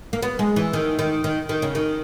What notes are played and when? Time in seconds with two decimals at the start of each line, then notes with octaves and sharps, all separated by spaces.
0.13 A#3
0.22 B3
0.39 G#3
0.56 E3
0.73 D#3
0.99 D#3
1.24 D#3
1.49 D#3
1.62 C#3
1.75 D#3